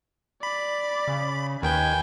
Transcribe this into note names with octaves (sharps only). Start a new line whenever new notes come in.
D5 B5
C#3
D#2 D#3 B4 G5 G#5 G6